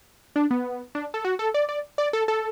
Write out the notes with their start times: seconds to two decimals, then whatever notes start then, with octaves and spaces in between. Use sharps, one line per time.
0.36 D4
0.51 B3
0.95 D4
1.14 A4
1.25 F#4
1.39 A4
1.54 D5
1.69 D5
1.98 D5
2.13 A4
2.28 A4